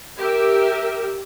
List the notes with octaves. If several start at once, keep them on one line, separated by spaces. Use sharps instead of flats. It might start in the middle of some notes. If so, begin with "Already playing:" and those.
G4 A#4 E5